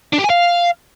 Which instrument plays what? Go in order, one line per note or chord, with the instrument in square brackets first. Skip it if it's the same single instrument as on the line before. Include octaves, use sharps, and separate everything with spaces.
[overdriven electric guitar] D4
G4
G#5
F5